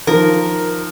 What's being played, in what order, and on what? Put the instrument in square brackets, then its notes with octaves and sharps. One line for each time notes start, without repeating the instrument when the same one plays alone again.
[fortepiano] D#3 F3 [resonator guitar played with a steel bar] A#4